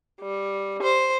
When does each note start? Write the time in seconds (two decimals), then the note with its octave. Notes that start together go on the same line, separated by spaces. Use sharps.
0.22 G3
0.83 C5